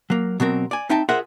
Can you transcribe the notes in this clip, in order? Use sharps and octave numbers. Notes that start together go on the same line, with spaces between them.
F#3 A#3
B2 F#3 C4 A#4
D5 G#5
C4 D#4 E5 G5 A5
F4 G#4 A#4 C5 E5 F#5